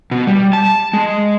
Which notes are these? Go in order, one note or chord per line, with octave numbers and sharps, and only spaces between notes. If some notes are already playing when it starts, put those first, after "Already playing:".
B2
G3
A5
G#3